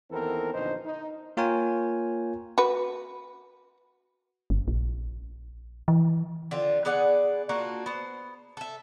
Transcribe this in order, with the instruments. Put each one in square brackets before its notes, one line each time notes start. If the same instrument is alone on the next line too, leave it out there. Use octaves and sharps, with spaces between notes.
[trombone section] D#2 E3 B3 C4 A4 A#4
A#1 E2 D3 D#4 B4 C5
D#4
[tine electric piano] A#3 F4 A#4 C#5 G5 G#5
[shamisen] F#4 B4
[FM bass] G1
A#1
E3
[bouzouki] D3 C4 F4
B3 G#4 D5 F#5
A#3 D4 F4 F#4
B3 C5
A4 E5